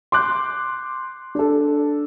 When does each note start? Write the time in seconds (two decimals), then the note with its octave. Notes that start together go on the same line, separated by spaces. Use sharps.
0.12 C6 D6 F#6 G6
1.35 D4 A4